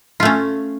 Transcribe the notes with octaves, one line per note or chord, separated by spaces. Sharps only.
A3 C#4 F4